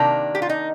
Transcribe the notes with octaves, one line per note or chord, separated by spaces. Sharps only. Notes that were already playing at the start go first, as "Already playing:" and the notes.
Already playing: C3 D#3 A#3 D4
G4
F4
D#4